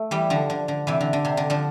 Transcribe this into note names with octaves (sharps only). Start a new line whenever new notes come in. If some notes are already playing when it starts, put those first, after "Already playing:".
Already playing: A3
E3 G3
D3 F3
D3
D3
C3 E3
D3
D3
C3
D3
D3 F3